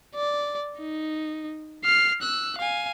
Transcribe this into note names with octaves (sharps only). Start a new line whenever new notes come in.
D5
D#4
F6 C7
E6 F#6
F5 G#5